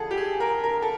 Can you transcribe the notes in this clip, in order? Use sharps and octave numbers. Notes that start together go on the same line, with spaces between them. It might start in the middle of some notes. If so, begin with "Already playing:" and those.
Already playing: F2 D3 G#4 A4
G4
G#4
A#4
A#4
A4